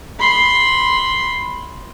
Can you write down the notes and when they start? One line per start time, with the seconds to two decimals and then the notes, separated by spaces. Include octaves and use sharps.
0.19 B5 C6